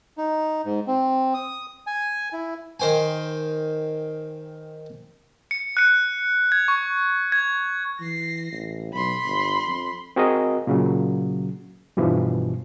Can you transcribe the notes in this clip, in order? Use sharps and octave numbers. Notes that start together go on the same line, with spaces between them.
D#4
G#2
C4
D#6
G#5
E4
D#3 C5 G5 G#5
C#7
F#6 C#7
G#6
C#6
G#6
E3 A#6 C7
A1
B1 B5 C6
G1
F2
C4 F#4 G#4 A#4 D#5
A#2 C#3 F#3
G2 B2 E3 F3